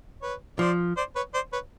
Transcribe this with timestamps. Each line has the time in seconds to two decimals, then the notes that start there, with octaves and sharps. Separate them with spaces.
0.22 B4 C#5
0.59 F3 C5 D5
0.97 C5 D5
1.15 B4 C#5
1.34 C5 D5
1.53 B4 C#5